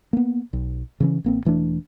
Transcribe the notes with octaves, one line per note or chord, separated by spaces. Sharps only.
A#3 B3
B1
C#3 E3 C#4
A1 A#3 C4
E1 E3 A3 D4